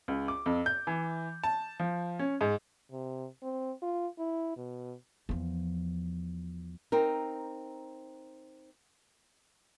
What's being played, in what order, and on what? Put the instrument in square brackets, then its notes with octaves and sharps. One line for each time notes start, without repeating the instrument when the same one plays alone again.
[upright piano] C#2
D6
F2
G6
E3
A5
F3
C#4
G#2
[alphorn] C3
C4
F4
E4
B2
[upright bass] E2 F3
[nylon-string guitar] C4 D#4 A#4